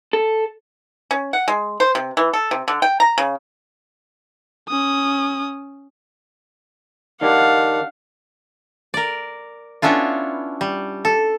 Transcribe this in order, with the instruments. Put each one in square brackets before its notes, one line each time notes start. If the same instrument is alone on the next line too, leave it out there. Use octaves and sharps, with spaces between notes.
[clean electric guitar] A4
[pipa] C#4
F#5
G#3
C5
C3
E3
A4
C3
D3
G5
A#5
C#3
[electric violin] C#4 D#6
[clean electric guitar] D#3 D4 G4 [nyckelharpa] F5 F#5
[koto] A#4 D5
B3 C#4 D4 E4 F4
G3
A4